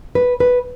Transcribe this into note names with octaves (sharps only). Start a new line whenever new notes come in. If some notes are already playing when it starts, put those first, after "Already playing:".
B4
B4